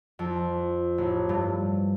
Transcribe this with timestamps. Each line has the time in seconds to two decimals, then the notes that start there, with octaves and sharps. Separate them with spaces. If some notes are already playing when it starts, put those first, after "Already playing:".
0.19 F2
0.98 A1
1.29 G2